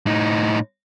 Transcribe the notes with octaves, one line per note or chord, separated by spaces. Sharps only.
A2 D#4